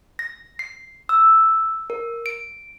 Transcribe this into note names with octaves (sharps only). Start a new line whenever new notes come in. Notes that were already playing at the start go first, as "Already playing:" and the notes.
A#6
C7
E6
A#4
D7